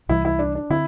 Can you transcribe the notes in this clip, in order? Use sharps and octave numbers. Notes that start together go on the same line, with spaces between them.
C2 C3 E3 G3 E4
E4
D4
D4
D3 C4 E4